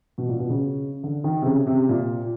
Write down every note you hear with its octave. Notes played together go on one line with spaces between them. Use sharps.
B2
A#2
B2
C#3
D3
D#3
C3
C#3
C3
A#2